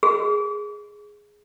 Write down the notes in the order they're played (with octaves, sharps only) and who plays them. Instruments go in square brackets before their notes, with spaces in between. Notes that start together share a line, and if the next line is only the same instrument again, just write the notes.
[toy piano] G#4